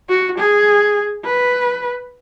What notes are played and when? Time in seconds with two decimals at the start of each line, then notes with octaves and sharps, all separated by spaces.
0.09 F#4
0.38 G#4
1.25 B4